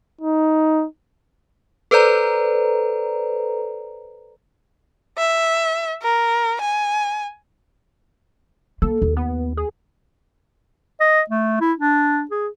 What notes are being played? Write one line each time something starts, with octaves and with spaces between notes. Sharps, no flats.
D#4
A4 B4 C5 D5 A#5
E5
A#4
G#5
A#3 A4
D#2
B3
G#4
D#5
A3
E4
D4
G#4